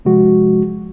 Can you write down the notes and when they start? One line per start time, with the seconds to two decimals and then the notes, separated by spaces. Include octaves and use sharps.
0.05 C3 F3 G#3 F#4